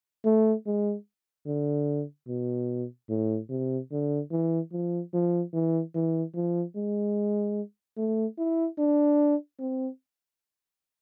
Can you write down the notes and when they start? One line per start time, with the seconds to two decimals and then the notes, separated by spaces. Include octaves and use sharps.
0.25 A3
0.66 G#3
1.47 D3
2.28 B2
3.09 A2
3.50 C3
3.92 D3
4.31 E3
4.72 F3
5.13 F3
5.53 E3
5.95 E3
6.35 F3
6.76 G#3
7.97 A3
8.38 E4
8.78 D4
9.59 C4